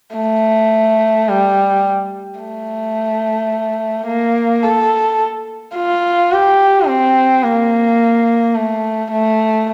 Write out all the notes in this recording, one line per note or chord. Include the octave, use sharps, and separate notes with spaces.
A3
G3
A3
A#3
A4
F4
G4
C4
A#3
A3
A3